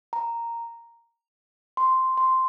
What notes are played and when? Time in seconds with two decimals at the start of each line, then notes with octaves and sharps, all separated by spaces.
0.13 A#5
1.77 C6
2.17 C6